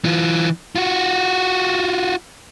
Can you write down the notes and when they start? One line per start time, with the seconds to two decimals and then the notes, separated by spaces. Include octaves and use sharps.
0.05 E3 F4
0.76 F4 F#4